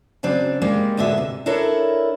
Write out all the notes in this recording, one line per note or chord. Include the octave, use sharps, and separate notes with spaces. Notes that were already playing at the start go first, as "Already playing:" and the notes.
C#3 F#3 C4 D4
G3 G#3 A#3
D2 G#2 B2 D3 E5
C3
D4 E4 A4 A#4 C#5